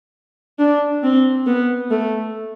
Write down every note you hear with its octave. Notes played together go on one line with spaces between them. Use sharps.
D4
C4
B3
A3